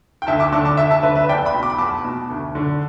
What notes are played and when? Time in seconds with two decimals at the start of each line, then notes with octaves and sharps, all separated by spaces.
0.22 G5
0.27 D2 E5 A5
0.40 A5 D6
0.52 D3 A5 D6
0.65 A5 D6
0.77 D2 E5 A5
0.91 E5 A5
1.03 D3 B4 E5
1.16 B4 E5
1.29 E2 D5 G5
1.45 G5 B5
1.54 B2
1.63 D6
1.70 B5
1.78 E2 A5 D6
2.05 B2
2.30 D2
2.55 D3